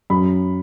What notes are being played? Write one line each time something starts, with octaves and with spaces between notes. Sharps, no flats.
F#2 B5